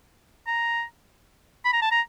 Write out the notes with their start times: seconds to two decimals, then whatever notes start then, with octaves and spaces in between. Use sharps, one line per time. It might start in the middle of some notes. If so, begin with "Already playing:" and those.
0.47 A#5
1.65 B5
1.73 A#5
1.82 A5
1.91 A#5